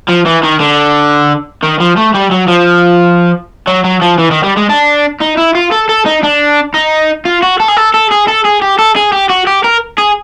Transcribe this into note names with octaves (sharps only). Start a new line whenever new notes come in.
F3
E3
D#3
D3
D#3
F3
A3
G3
F#3
F3
F#3
F#3
F3
E3
D#3
G3
G#3
D4
D#4
E4
F4
A4
A4
D#4
D4
D#4
F4
F#4
A4
G#4
A4
A4
G#4
A4
G#4
G4
A4
G#4
G4
F#4
G4
A#4
G#4